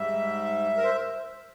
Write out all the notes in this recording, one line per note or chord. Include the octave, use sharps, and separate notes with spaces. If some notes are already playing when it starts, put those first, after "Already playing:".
Already playing: G#2 G3 E5
A#4
C5